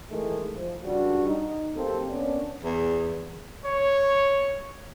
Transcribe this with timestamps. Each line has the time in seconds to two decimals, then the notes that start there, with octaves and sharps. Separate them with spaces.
0.11 D#3 E3 G#3 A3
0.55 F3
0.84 C#2 G2 G3 D4 F#4
1.27 D#4
1.75 B1 C3 A#3 C4 A4
2.09 A#3 B3 C#4 D4
2.63 E2
3.65 C#5